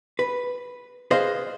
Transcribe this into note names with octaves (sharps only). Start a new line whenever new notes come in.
B4
G#4 B4 C5 D#5 F5